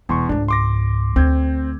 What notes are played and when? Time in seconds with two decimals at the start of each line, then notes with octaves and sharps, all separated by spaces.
0.09 E1 E2 C6 C#6
0.29 C#2 G#2 D4
0.48 C6 D6 A#6
1.16 D2 C4 G6 G#6